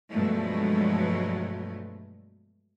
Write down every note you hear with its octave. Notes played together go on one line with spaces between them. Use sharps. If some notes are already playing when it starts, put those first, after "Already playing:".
G2 B2 F3 F#3 G#3 A3